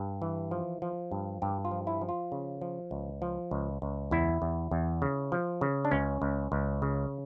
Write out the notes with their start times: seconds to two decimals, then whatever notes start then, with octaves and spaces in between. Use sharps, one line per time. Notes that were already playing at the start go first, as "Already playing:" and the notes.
Already playing: G2
0.22 E3
0.51 F3
0.82 F3
1.12 G2
1.42 G2 G4
1.65 F4
1.71 F3
1.87 E4
2.01 F3
2.09 F4
2.32 C#3
2.62 F3
2.91 C#2
3.22 F3
3.51 C#2
3.82 C#2
4.11 E2 E4
4.42 E2
4.71 E2
5.02 C#3
5.32 F3
5.61 C#3
5.85 D4
5.91 C#2 C#4
6.22 C#2
6.52 C#2
6.82 C#3